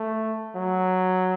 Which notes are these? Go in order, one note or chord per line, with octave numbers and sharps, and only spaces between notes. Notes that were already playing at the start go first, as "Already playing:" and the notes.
Already playing: A3
F#3